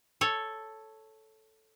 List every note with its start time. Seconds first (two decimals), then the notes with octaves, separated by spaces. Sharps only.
0.21 A4 C#5